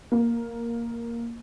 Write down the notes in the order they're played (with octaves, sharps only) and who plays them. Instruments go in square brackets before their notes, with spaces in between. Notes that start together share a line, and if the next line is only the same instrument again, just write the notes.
[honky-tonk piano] A#3